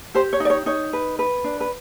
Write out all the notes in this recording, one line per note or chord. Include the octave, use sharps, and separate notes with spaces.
G4 C5
C#5
D#4
D5
C#5
D#4 C#5
B4
B4
D4
B4